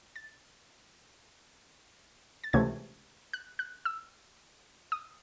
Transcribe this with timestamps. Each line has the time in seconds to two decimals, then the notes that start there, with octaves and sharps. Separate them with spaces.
0.16 A6
2.44 A6
2.53 C#2 C3 E3 A3 C#4 G#6
3.33 F#6
3.59 F#6
3.85 E6
4.92 D#6